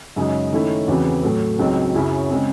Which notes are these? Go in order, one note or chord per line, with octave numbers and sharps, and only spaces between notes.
F#2 C#3 G#3 D#4
D#3 A3 C#4 E4 A4
E2 C#3 E3 C4 F#4
A2 F#3 A3
C#2 C#3 F#3 C4 D#4
F#2 C#3 F#3 C#4 E4
C#3 G#3 C4